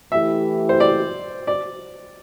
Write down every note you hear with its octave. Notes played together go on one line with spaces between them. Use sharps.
E3 A3 E4 G4 E5
C5
D5
D5